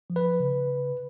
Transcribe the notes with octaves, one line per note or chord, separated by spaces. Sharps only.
F3
B4
C#3